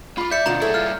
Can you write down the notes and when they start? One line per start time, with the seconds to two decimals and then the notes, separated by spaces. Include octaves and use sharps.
0.18 F4 B5 D6
0.31 D5 E5 G6 C#7
0.46 B2 D3 F3 B3 F4 A#5
0.61 G2 E4 G#4 A4 C#5 F#5
0.74 F4 F6